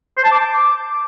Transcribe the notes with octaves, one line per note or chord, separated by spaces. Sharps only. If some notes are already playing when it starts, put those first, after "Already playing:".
C5
A5
D6